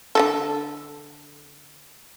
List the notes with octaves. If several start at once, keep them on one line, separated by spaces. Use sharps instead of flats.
D3 F#3 A4